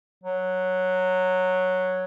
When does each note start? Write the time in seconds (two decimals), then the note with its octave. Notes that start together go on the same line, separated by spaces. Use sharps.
0.23 F#3